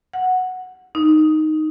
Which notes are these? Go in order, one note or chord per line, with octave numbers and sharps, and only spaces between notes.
F#5
D#4